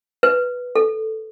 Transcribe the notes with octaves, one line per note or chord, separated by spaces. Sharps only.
B4
A4